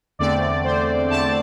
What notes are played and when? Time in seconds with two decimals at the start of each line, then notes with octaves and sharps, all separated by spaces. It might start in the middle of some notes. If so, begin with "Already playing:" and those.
0.19 E2 D3 A3 C4 D5
0.64 C5
1.10 E2 D3 A3 C4 A5